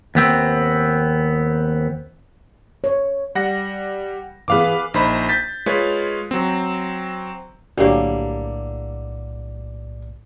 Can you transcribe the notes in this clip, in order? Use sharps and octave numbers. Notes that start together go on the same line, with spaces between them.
D#2 B3 C4
C#5
G3 F#5 A#6
E3 B3 G#4 B4 F5 D6
A#1 D#4 C5 B5
G6 A6 B6
G#3 F4 B4 C#5
F#3 C4
B1 A2 D3 G3 A#3 F#4 G4 C#5